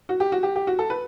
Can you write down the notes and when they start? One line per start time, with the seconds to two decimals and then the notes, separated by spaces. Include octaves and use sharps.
0.09 F#4
0.20 G4
0.32 F#4
0.43 G4
0.56 G4
0.67 F#4
0.79 A4
0.90 B4